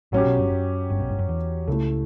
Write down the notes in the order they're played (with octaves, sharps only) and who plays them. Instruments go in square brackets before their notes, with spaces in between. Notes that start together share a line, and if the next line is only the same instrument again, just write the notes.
[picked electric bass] A1 A2 [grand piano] F#3 C#4 G4
[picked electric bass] B1 B2
G1 G2
F#2
G1 G2
B1 B2
G1 G2
F#2
E2
[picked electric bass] C#2 C#3 [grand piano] A3 E4 A4